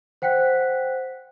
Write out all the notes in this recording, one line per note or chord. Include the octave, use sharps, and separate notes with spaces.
C5 F#5 G5 F#6 B6